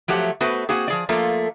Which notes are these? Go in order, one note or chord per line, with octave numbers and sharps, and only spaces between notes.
F3 F#3 A3 G4 F#5
A3 B3 F#4 B4 C5
A#3 C4 F#4 G#4
F3 G#4 D5
F3 A3 A#3 F4 A4